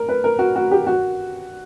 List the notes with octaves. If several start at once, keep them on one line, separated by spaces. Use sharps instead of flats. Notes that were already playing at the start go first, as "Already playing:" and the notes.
Already playing: A#4
B4
A#4
F#4
F#4
G4
F#4